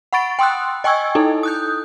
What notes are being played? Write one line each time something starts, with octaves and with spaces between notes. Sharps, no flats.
F#5 B5 C#6 A6 D7
G5 C6 D#6 E6 F#6
D#5 G5 G#5 C#6 E6 G#6
D#4 E4 A4
D#6 F#6 G6